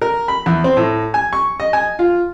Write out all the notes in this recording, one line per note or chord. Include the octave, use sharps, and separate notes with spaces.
A#4
B5
E2
C4
A2
G#5
C#6
D#5
G#5
F4